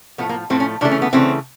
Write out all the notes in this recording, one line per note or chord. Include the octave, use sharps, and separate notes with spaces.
A2 F3 A3 B3
A#3
A2 F3 A3 C4
C#4
C#3 E3 A3 D4
C#4
B3
C#3 E3 A3 C4